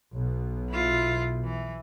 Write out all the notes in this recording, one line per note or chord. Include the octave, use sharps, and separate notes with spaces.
B1 B2
E4 F4
E3